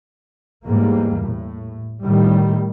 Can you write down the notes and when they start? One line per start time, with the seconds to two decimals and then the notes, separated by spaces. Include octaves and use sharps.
0.65 E2 G#2 G3 A#3
1.25 A2
2.04 A2 D#3 G3